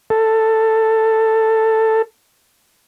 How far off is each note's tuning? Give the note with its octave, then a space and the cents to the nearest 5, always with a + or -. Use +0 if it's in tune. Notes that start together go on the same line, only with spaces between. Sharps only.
A4 +10